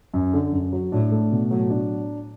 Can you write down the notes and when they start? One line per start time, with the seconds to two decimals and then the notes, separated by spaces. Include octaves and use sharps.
0.14 F#2
0.33 D3
0.52 F#2
0.73 F#3
0.92 A2 D4
1.12 A3
1.32 B2
1.51 A2 F#3
1.70 D4